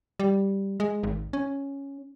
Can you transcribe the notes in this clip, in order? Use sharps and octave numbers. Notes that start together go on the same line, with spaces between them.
G3
G#3
G#1
C#4